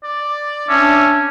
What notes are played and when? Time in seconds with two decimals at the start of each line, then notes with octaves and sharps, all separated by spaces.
0.03 D5
0.68 C#4 D4 E5